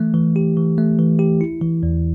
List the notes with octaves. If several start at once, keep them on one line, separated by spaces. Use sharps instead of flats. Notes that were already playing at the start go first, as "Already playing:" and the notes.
Already playing: E3 A3
E3
G4
E3
A3
E3
G4
E4
E3
E2